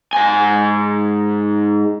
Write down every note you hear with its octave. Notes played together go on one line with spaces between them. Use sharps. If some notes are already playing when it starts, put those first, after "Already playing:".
G#2 G#5